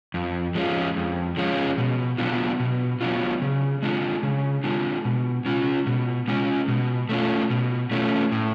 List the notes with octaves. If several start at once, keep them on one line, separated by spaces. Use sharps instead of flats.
F2
F3 G#3 C#4 F4
F2
F3 G#3 C#4 F4
B2
F#3 B3 D4 F4
B2
F#3 B3 D4 F4
C#3
G#3 D4 F4
C#3
G#3 D4 F4
B2
G#3 C#4 F4
B2
G#3 C#4 F4
B2
A3 C#4 F4
B2
A3 C#4 F4
A2